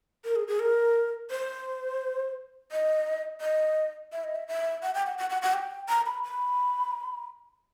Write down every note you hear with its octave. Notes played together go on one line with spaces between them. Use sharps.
A#4
G#4
G#4
A#4
C5
D#5
D#5
E5
D#5
E5
E5
F#5
G5
F#5
F#5
F#5
F#5
G5
A#5
B5
B5